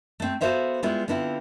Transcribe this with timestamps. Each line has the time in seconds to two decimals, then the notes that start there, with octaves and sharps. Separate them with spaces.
0.20 A3 C4
0.41 B3 F#4 A4 C5 E5 F5
0.83 G3 G#3 B3 E4 F4
1.08 D3 B3 C4 E4 F4